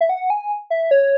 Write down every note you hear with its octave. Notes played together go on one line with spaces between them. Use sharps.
E5
F#5
G#5
E5
C#5